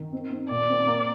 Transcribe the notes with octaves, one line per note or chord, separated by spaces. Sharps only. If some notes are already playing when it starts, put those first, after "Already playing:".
Already playing: D#3
C4
C4
A#2 D5
C4
A#3